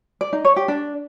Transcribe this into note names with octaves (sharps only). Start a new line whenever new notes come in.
D5
D#4
C#5
G4
D4